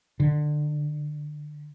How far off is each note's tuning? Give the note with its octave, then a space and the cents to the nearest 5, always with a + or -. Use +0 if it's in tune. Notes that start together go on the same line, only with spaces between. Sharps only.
D3 +25